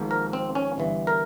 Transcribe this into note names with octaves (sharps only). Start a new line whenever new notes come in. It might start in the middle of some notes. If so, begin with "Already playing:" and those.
Already playing: G#1 G#2 F3 A#3
A#4
C4
C#4
G1 G2 E3
A#4